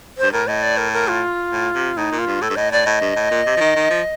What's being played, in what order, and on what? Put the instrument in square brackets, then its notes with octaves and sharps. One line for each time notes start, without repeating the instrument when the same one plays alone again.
[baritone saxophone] G2 [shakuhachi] C5
[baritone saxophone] A2 [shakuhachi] A#4
[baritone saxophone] A2 [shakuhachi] D#5
[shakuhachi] D5
A#4
A#4
F4
[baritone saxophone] A2
C3
[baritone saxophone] A2 [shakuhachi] D#4
[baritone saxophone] A#2
[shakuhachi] F4
[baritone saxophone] G2
[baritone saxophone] A2 [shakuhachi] A4
[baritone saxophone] G2
[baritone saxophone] A2 [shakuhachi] D#5
[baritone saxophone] A2 [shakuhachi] D5
[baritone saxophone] A2 [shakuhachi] D#5
[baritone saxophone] G2
A2
A#2
C3
F3
D#3
D#3
F3